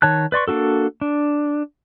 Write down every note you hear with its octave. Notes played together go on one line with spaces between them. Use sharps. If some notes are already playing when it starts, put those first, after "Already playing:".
D#3 C#5 A5 F#6
B4 D5 C6 C#6
A#3 D4 F#4 A4
D4